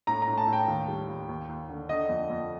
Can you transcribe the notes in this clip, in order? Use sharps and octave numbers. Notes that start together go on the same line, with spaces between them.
A2 A#5
A#5
A2
A5
A2
G5
D#2
G3
D#2
D#2
D#2
D3
D3 D#5
F2
F2